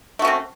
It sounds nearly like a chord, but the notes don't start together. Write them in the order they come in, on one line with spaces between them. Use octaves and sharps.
A3 F#4 C#4 C4